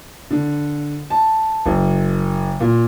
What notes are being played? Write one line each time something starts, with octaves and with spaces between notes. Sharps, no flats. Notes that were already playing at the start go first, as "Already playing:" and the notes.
D3
A5
F#1
A#2